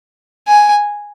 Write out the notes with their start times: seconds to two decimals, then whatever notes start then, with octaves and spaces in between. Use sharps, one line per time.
0.48 G#5